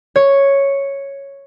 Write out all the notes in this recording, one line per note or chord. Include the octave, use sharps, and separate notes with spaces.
C#5